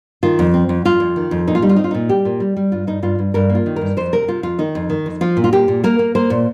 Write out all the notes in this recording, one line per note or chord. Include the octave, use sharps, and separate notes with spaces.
D#3 F4
F2
C4
F2
F2 F4
F2
D#3
F2
A#2 D#4
F4
G3 D#4
F4
D#4
C4
F4
A#2 D#4
G3 G4
A#2
G3
G3
G2 F4
G2 D#4
G2 F4
G2
G2 A#4
A#3
F4
D#3
G2 A#4
F2 C5
C3 A#4
C3 F4
F2 F4
D#3 D#4
F2
D#3
F2
F3 F4
A#2
F4
A#2 G4
A#2
A#3 A#4
A#3
A#3 C5
A#2